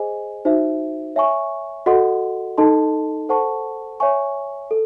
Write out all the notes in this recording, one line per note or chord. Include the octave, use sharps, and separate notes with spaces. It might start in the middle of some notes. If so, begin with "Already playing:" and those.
Already playing: G#4 C5 D#5 G#5
D#4 F#4 C5 E5
C#5 E5 G#5 C#6
F#4 A4 D#5 F#5 C6
D#4 A4 D#5 A5 C6
A4 C5 F#5 A5 C#6
C#5 E5 G#5 C#6
A4